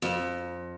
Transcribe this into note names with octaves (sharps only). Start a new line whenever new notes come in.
F2